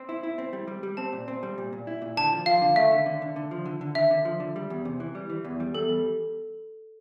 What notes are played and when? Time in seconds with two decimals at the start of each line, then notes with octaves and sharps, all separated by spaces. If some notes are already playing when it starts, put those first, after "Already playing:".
Already playing: C4
0.09 E4
0.23 E4
0.38 C4
0.53 G3
0.67 G3
0.83 G3
0.97 C4 A5
1.13 A#2
1.28 C4
1.43 G3
1.58 A#2
1.72 A#2
1.87 E4
2.02 A#2
2.17 D3 A5
2.32 F3
2.46 F3 F5
2.62 D3
2.76 A3 E5
2.91 D3
3.06 D3
3.22 D3
3.36 D3
3.51 F3
3.65 D3
3.81 D3
3.95 D3 E5
4.11 D3
4.25 F3
4.40 D3
4.56 G3
4.70 E2
4.85 C3
5.00 E3
5.15 G3
5.30 E3
5.44 E2
5.60 G3
5.75 E2 A4
5.89 G3